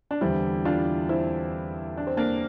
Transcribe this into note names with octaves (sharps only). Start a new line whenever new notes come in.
D4
E2 D3 G3 C4 E4
D4 F4
C4 E4
D4
C4
A#3 D4